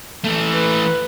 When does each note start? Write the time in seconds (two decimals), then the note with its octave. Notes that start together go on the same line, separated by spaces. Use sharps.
0.24 E3 A3
0.54 B4